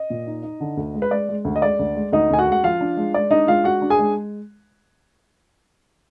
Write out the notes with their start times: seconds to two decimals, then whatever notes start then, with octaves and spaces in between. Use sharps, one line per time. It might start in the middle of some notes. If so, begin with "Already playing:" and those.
Already playing: D#5
0.10 A#2
0.27 D#4
0.43 D#4
0.60 D3
0.77 D2
0.94 G#3
1.02 B4
1.11 G#3 D5
1.29 G#3
1.45 D2
1.56 D#5
1.62 G#3 D5
1.79 D2
1.96 G#3
2.12 D2 D#4 D#5
2.30 D2 G#5
2.39 F#4 F#5
2.47 G#3
2.52 F#5
2.64 F3 F4 F5
2.81 D4
2.97 G#3
3.14 G#3 D5
3.31 D4 D#4 D#5
3.47 G#3 F4 F5
3.64 D4 F#4 F#5
3.82 D4
3.90 G#4 G#5
3.99 G#3